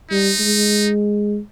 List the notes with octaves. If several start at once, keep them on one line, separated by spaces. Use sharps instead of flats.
G3 D#4
G#3